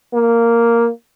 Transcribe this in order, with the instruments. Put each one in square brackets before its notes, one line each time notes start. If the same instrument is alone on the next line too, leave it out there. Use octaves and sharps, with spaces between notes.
[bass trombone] A#3